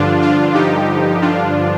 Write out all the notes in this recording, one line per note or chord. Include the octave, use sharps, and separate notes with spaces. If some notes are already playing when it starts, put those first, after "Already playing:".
Already playing: G2 D3 F3 D4 F4
D4 F4
G2 D3 F3 D#4 G4
G2 D3 F3 D4 F4